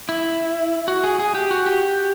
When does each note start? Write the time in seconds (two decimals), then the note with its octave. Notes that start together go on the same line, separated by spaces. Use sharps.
0.09 E4
0.88 F#4
1.03 G#4
1.20 G#4
1.35 G4
1.51 F#4
1.66 G4